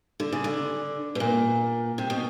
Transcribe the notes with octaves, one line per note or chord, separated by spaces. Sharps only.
D3
C#3
D3
B2
A#2
C3
B2